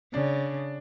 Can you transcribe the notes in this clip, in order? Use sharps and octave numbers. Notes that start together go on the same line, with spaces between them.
C#3 D4